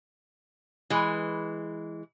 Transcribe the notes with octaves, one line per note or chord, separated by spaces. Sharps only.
E3 G#3